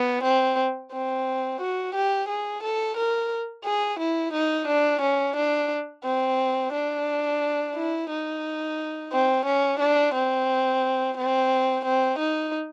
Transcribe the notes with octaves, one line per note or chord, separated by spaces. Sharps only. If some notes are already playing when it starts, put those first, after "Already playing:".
Already playing: B3
C4
C4
F#4
G4
G#4
A4
A#4
G#4
E4
D#4
D4
C#4
D4
C4
D4
E4
D#4
C4
C#4
D4
C4
C4
C4
D#4